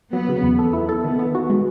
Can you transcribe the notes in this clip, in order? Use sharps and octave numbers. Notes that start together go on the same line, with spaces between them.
F#3 B3
C#3
E2
A4
E4
A4
D#3 B3
B3
F#4
G#3